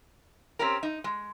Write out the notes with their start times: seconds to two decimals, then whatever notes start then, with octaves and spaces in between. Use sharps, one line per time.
0.59 C4 C#4 G4 A#4
0.83 D#4
1.04 G#3